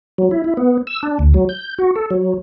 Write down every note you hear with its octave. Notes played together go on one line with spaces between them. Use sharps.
F#3
E4
E4
B3
E6
D4
D2
F#3
G6
F#4
A4
F#3